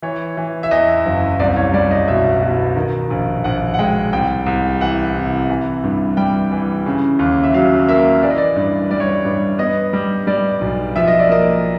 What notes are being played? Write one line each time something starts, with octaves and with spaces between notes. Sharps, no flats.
E3 C#5
E3
E5
E2 D#5
F#1
C2 D5
C#5
G3 D5
D#5
B2 E5
B2
D#3
A#1
A#1 F#5
F#5
G#3 G5
C2 G5
C2
E3 F#5
C3
E3
G2
G3 G5
E3
C#3
D#2
E5
F#3 F5
A#3 E5
E3 D5
D#5
D5
G2
G3 D5
C#5
D5
G2
B3 D#5
G3
G3 D5
B1
F3 E5
D#5
D5
A#3 D#5